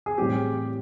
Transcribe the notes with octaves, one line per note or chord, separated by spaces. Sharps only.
G#4
A2 E3 G3 C4 G4